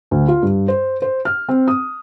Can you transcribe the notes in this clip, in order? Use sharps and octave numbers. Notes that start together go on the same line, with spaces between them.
D2
F4
G2
C5
C5
F6
C4
D#6